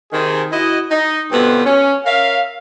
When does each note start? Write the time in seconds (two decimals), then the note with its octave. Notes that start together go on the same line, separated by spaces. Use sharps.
0.12 C3 D#3 G#4
0.52 E4 F#4 D#5
0.91 D#4 D#5
1.31 G2 B2 D3 B3 C4 F4
1.65 C#4
2.06 A#4 C#5 E5 F5